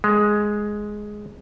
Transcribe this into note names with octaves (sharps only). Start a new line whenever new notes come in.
G#3